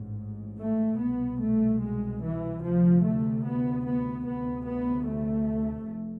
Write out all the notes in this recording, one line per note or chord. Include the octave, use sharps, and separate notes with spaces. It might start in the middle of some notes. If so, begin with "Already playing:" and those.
Already playing: A1 G#2
A3
C2 B2 B3
A3
G#3
E3
D2 C3 F3
A3
B3
B3
D2 C3 B3
B3
A3
F1